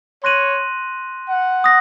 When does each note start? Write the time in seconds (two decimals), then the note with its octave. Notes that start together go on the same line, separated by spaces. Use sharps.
0.23 C#5 C6 F#6 A#6 D#7 F#7
1.29 F#5
1.64 D#6 A#6